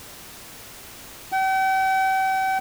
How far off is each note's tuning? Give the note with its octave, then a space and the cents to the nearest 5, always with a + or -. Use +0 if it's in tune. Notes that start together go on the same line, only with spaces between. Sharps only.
G5 -45